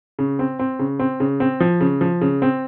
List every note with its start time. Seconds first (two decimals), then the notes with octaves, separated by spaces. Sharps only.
0.19 C#3
0.39 C4
0.59 C4
0.79 C#3
0.99 C4
1.20 C#3
1.40 C4
1.60 F3
1.81 C#3
2.01 F3
2.21 C#3
2.42 C4